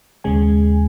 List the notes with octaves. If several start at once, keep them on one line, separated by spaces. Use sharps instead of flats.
D#2 C#3 G#3 G#5